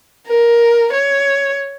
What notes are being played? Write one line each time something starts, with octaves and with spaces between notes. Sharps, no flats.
A#4
C#5